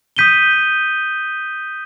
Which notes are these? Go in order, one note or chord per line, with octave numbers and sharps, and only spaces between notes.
D#6 G6 B6 D#7 G7